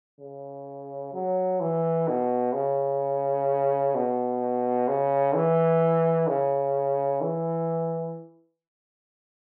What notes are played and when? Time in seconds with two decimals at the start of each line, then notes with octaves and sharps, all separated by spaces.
0.21 C#3
1.14 F#3
1.60 E3
2.08 B2
2.53 C#3
3.95 B2
4.88 C#3
5.35 E3
6.28 C#3
7.21 E3